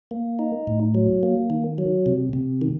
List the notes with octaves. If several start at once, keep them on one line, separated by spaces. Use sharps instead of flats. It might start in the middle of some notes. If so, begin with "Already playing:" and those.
A#3
D#4
A2
F#3
A#3
D#3
F#3
C3
C3
D#3